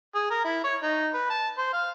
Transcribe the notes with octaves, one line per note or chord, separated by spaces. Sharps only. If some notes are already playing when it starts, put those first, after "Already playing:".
G#4
A#4
E4
C#5
D#4
B4
A5
C5
F5